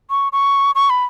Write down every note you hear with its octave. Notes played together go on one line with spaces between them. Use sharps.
C#6
C#6
C#6
B5